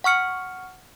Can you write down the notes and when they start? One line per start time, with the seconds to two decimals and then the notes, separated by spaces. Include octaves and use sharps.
0.04 F#5 C#6 F6 C#7